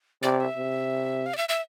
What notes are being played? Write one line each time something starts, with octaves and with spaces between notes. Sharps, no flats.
C3 D5
E5
C3
F5
D5
E5
E5